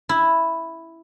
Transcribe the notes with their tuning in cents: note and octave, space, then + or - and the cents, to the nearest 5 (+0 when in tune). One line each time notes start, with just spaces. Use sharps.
E4 +0